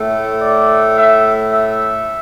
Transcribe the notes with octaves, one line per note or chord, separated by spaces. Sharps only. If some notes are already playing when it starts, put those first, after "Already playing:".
Already playing: A2 A3
D5
E5
E5